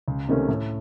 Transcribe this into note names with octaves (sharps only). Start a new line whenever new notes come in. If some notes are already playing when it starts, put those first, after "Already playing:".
C#2
C3 D#3 A3 C#4
A2